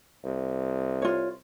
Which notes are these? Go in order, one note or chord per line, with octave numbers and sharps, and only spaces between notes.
C2
F4 C#5